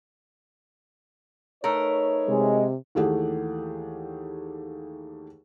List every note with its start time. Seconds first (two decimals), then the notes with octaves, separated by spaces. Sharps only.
1.64 A3 D#4 A#4 B4 C#5
2.29 C3 G#3
2.95 D#2 E3 A3 G4 G#4 F#5